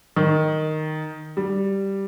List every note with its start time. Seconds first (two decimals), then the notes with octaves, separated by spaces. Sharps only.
0.16 D#3
1.37 G3